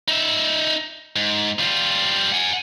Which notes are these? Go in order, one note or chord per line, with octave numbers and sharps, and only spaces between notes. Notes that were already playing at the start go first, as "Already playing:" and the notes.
D#4 E5
G#2
G3 F4
F#5 G#5